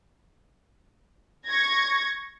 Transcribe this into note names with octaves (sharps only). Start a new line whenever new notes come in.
C#6 G#6 A#6